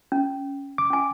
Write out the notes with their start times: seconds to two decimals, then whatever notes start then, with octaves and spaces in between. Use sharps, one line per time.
0.12 C#4
0.78 D6
0.90 C#4 G#5